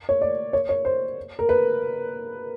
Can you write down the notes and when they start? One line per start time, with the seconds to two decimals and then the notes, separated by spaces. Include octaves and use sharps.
0.09 C#5
0.22 D5
0.53 C#5
0.69 C#5
0.85 C5
1.39 A#4
1.49 B4